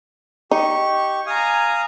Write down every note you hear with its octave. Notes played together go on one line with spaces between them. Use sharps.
D#4 G4 C#6
F5 G#5 A#5 D#6